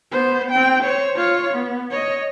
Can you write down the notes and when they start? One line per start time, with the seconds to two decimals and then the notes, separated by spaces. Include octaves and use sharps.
0.11 B3 C5
0.51 C4 G5
0.83 C5 C#5
1.16 F4 C#5
1.54 B3
1.91 C#5 D#5